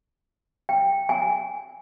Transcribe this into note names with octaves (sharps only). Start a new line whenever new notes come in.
G5
G#5